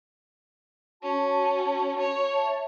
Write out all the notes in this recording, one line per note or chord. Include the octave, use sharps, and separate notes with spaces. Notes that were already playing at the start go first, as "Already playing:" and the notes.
C#4 F#4 A5
C#5
E5 A5